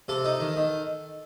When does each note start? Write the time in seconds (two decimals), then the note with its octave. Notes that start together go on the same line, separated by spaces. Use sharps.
0.08 C3 A4
0.25 D#4
0.40 D#3
0.56 D#3